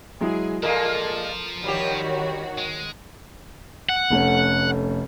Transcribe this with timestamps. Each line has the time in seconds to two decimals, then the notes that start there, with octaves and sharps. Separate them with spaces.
0.21 F#3 G#3 E4 G#4
0.63 A#2 F3 G#3 A#3 F4 A4 A#4
1.64 D#3 G3 F#4 G4 C#5
2.58 G#3
3.89 F#5
4.10 F1 A3 C#4